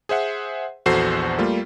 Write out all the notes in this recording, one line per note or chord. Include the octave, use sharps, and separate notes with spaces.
G#4 C5 E5 F#5
A#1 E2 F#4 A4 C5 C7
G3 A3 A#3 F4